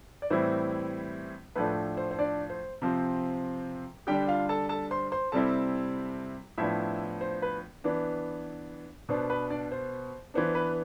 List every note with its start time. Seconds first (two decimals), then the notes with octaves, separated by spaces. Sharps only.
0.22 D5
0.30 A2 E3 G3 C4 E4 C5
1.55 A2 F3 A3 D4 B4
1.97 C5
2.11 C5
2.19 D4 D5
2.50 C5
2.82 C3 F3 C4
4.07 D3 G3 D4 G4 G5
4.27 F4 F5
4.49 A4 A5
4.69 A4 A5
4.91 C5 C6
5.12 C5 C6
5.32 C3 G3 C4 E4 A4 A5
6.57 A2 F3 B3 D4 E4 E5
7.21 C5
7.42 B4
7.84 E3 B3 D4
9.09 B2 B3 D4 C5
9.30 B4
9.50 D4 D5
9.72 C5
10.34 E3 B3 D4 C5
10.55 B4